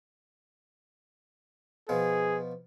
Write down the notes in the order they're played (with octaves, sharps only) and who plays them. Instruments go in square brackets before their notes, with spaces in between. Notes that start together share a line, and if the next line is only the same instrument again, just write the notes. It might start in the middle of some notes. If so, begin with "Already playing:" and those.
[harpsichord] B2 F3 [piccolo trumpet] G#4